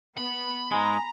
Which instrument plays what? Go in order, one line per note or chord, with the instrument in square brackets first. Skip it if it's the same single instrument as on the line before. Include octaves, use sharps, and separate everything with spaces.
[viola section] B3 [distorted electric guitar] B5
[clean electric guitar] G#2 G#3 [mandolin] G#4 [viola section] A#5